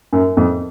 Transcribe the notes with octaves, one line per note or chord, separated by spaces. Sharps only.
F#2
F2